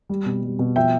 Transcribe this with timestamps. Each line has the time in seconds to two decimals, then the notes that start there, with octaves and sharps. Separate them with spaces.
0.09 G3
0.26 B2
0.43 G3
0.59 B2
0.76 F3 E5 G5